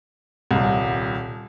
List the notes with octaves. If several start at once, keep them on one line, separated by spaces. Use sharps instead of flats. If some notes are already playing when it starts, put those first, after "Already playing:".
D#1 C2